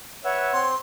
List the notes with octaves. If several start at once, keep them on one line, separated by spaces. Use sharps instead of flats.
B4 C#5 E5 F#5 E6
C4 C6